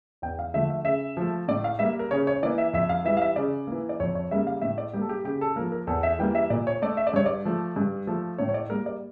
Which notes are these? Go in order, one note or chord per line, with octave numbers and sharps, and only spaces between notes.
E2 G5
F5
D3 F3 A3 E5
E5
C#3 E5
F3 A3
A2 D5
F5
G3 A#3 E5
A#4
C#3 C#5
C#5
E3 A#3 D5
E5
F2 E5
F5
E3 G3 E5
F5
E5
C#3 D5
E3 A#3
D5
F2 C#5
C#5
C#3 G3 A#3 E5
F5
A2 E5
D5
G3 A#3 G4
A4
G4
C#3 G4
A4
F3 A#3 A#4
A#4
E2 A4
E5
E3 G3 A#3 G5
E5
A#2 D5
C#5
A3 D5
E5
D5
G2 C#5
D5
F3 A3
G2
F3 A3
A2 C#5
C#5
D5
G3 A#3 A#4
D5